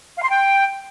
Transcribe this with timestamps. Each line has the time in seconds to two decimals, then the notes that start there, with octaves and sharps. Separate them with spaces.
0.18 F5
0.23 C6
0.29 G5